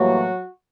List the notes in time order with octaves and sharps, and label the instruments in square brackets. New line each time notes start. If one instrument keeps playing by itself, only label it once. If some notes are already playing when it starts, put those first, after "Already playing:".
Already playing: [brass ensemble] A2 E3 F#3 G3 A#3 F#4